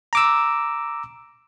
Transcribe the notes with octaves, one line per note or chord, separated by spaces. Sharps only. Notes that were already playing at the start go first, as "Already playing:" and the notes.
A#5 D6 E6